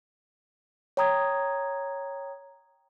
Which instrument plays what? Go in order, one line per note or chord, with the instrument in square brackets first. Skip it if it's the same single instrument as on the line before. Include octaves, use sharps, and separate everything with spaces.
[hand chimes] C#5 G5 A#5 D#6 G#6